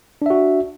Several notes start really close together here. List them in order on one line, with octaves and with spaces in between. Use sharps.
D4 E5 F#4